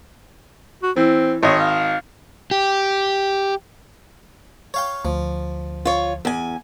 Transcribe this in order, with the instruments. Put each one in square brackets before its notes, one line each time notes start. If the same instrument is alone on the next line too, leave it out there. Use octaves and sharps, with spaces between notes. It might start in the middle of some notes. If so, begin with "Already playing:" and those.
[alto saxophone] F#4
[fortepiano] E3 [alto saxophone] C4
[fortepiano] G#1 D#5 [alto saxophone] C#5
[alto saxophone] F5
[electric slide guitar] G4
[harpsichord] C#5 F5 G5
[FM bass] D2 [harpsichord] F3
[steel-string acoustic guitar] F4 C#5
E2 G#5